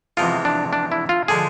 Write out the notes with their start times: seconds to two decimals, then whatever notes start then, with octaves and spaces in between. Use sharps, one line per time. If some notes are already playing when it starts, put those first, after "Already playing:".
0.17 E2 C3 F3 G#3 F4
0.45 D4
0.73 D4
0.92 E4
1.09 F4
1.28 D3 F3 G#3 G#4